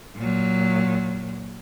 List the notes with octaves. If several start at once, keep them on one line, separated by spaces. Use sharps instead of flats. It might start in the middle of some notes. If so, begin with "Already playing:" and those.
A#2 F#3